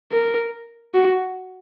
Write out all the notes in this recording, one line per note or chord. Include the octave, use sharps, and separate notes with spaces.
A#4
F#4